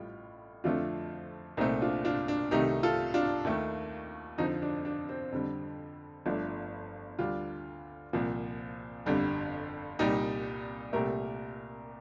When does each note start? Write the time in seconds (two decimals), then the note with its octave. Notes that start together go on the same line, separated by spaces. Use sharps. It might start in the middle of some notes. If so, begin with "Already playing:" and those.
Already playing: A1 A2 G3 F4
0.64 F2 D3 F3 A3 D4 F4
1.57 C2 A#2 A3 C4 D#4
1.81 D4 F4
2.05 D4 F4
2.28 D4
2.51 C2 C3 D#3 A3 D#4 G4
2.83 F4 A4
3.14 D4 F4
3.45 D#2 D#3 A3
4.38 F2 D3 F3 C4 D#4
4.62 D4
4.85 D4
5.09 C4
5.32 F2 D3 G3
6.26 G1 G2 F3 A3 D4
7.19 D2 D3 G3 D4 F4
8.13 C2 A#2 F3
9.06 G1 F2 D3 G3
9.99 C2 A#2 G3 D#4 G4
10.93 C2 A#2 A3 G4 A#4